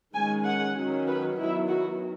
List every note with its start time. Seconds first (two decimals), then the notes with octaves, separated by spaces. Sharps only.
0.14 D#3 G#3 C#4 G#5
0.45 F#5
0.76 D#3 F#3 C#4
1.07 B4
1.38 D#3 F#3 B3 E4
1.68 F#4